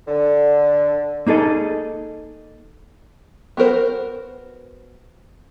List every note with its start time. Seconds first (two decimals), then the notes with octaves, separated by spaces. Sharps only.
0.08 D3
1.27 A#3 D#4 G#4 A4 D#5
3.57 B3 F#4 A#4 C5